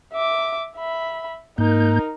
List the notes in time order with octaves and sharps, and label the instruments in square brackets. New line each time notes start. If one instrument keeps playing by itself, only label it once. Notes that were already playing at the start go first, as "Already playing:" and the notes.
[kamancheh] E5 D6
E5 B5
[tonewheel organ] G#2 A#3 G6 [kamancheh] D#4 A#4